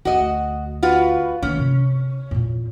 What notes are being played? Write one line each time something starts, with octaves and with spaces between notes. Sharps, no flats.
D2 F#4 D#5
F4 F#4 B4
D#3 A#3 C#4
C3
E2 A#2